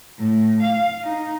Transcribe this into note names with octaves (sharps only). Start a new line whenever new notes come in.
A2
F5
D#4